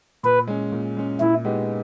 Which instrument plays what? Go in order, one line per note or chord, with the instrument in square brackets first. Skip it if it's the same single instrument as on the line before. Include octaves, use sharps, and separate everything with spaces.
[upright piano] A#2 [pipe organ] B4
[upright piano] G#3 C#4
A#2
G#3 C#4
[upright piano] A#2 [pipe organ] E4
[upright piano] G#3 B3 D#4 G4